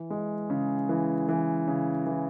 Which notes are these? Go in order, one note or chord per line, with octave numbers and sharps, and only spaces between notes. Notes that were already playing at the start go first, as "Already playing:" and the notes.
Already playing: E3
G#3
C#3
E3
E3
C#3
E3